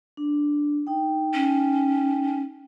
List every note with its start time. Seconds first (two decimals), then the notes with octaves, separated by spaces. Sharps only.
0.17 D4
0.87 D#4 G5
1.34 C#4